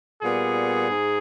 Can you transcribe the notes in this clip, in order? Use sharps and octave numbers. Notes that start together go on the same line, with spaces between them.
A#2 G3 B3 G#4
G#2